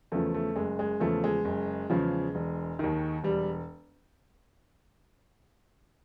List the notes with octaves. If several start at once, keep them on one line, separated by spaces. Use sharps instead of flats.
E2 C#3 F3 A3
A3
F#1 G#3
G#3
E2 C#3 F3 A3
G#3
F#1
E2 C#3 F3
E1
D#2 D#3
E1 G3